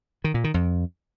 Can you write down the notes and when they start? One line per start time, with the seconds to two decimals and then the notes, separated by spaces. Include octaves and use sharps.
0.24 D#3
0.34 A#2
0.44 D#3
0.54 F2